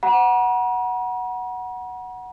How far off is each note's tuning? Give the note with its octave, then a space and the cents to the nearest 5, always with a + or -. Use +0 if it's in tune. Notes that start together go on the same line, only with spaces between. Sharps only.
F#5 +0 A#5 +45